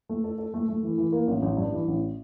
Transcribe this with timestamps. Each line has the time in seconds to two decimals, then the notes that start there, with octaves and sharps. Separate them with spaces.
0.09 A3
0.24 A4
0.38 A4
0.54 A3
0.69 A3
0.83 E3
0.98 E3
1.12 A#3
1.27 A1
1.42 A1
1.57 G2
1.72 E3
1.88 A1